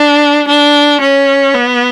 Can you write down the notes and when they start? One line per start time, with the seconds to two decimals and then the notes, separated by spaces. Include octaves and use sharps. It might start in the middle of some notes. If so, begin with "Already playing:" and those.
Already playing: D4
0.48 D4
1.01 C#4
1.54 B3